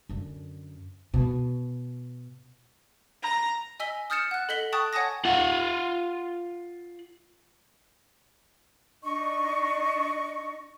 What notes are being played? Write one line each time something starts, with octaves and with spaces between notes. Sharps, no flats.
F#2 D3
B2
A#5
D#5 G#5 E6 B6 G7
D#6 F6 G6 A6 C#7 E7
F#5 F#6
A4 D#5 F#5 B6 F#7 G7
G5 A5 C#6 D#6 F#6 A6
C#5 F#5 G#5 A5 D#6 A#6
F4 F#5
D4 D#4 D#5 C#6